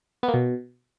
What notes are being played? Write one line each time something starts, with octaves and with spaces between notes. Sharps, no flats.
B3
A#3
B2